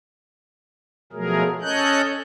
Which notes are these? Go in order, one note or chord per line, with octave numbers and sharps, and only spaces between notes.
B2 F3 F#3 A3 G#4 A#4
C#4 A4 C#5 D#5 F#6 G6